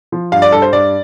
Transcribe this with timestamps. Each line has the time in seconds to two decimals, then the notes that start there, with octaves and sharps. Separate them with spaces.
0.12 F3
0.32 G2 F5
0.42 D5
0.52 G2 A4
0.62 C5
0.72 G2 D5